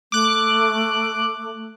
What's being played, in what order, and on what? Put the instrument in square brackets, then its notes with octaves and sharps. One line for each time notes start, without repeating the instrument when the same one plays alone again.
[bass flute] A3 [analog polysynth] D6 F#6